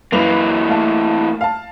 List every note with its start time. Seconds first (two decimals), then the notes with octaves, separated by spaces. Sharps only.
0.12 F#2 E3 A#3 B4 F7
0.68 A3 F5 A5
1.41 F5 A5